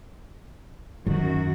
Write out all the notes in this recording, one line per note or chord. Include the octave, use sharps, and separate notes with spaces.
F#2 D#3 F#4